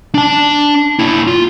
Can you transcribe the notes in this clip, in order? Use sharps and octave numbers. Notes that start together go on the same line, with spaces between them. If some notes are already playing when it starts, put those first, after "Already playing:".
D4 A5
A#3 E4
F4